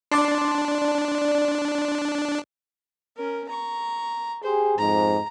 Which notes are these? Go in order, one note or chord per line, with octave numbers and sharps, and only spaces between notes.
D4 D5 A5 C6
C#4 A#4
A#5 C#6
G4 G#4 C5
F2 G#2 A#5